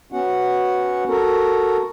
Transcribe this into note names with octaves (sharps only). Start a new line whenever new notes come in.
B3 C#4 F#4 F#5
F#4 A4 A#4